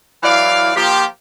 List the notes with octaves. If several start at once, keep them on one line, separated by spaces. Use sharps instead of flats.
E3 F#3 E4 D5 F5
F3 A#3 F4 G4